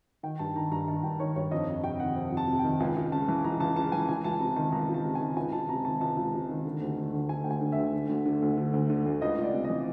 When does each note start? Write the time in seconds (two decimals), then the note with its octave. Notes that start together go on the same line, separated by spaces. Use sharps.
0.23 D#3 G5
0.39 G2 A5
0.55 D#3 A#5
0.71 G2 A#5
0.88 D#3 A5
1.04 G2 G5
1.20 D#3 C#5
1.36 G2 C#5
1.51 F2 D#5
1.68 F2
1.84 C3 G5
2.00 D#3 F#5
2.16 F2
2.32 F2
2.37 A5
2.48 C3
2.59 G5
2.64 D#3
2.80 C#2 G#5
2.96 C#2
3.12 C#3 A5
3.28 E3
3.44 C#2 A#5
3.60 C#2 A5
3.76 C#3 A5
3.92 E3 G#5
4.09 C#2 G#5
4.24 C#2 A5
4.40 C3 A#5
4.56 D#3 A5
4.72 C#2 A#5
4.89 C#2
4.94 A5
5.05 C3
5.15 G#5
5.21 D#3
5.36 C#2 G#5
5.53 C#2 A5
5.69 C3 A#5
5.85 D#3 A5
6.01 C#2 A5
6.17 C#2
6.34 C3
6.49 D#3
6.65 D3
6.81 D2
6.97 D3
7.13 D2
7.29 D3 G#5
7.44 D2 G5
7.51 G#5
7.61 D3
7.72 E5
7.78 D2
7.93 D3
8.09 D2
8.26 D3
8.42 D2
8.57 D3
8.73 D2
8.90 D3
9.06 D2
9.22 C#2 D#5
9.38 C#2 D5
9.54 C3
9.64 D#5
9.70 E3